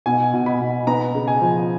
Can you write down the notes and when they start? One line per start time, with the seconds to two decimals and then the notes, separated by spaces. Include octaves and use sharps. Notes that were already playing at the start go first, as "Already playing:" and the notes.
0.06 B2 G#5
0.34 B2
0.46 B5
0.61 B2
0.87 B3 A#5
1.15 C#3
1.28 G#5
1.41 F3